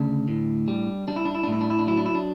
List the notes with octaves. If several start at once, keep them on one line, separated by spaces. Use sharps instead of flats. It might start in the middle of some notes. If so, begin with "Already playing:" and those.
Already playing: D2 C#3 D4
A2
G3
G3 D4
E4
D4
E4
A2 D4
E4
D4
E4
D4
F#3 E4
D4
E4
D4